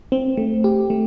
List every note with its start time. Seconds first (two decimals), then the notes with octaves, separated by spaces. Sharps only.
0.12 C4
0.37 A3
0.64 G4
0.90 A3